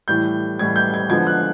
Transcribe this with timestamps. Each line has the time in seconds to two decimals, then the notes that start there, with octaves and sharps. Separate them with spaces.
0.08 A2 E3 G3 G6
0.59 A2 E3 G3 G#6
0.76 G6
0.94 G#6
1.10 D3 F3 G#3 B3 G#6
1.27 F#6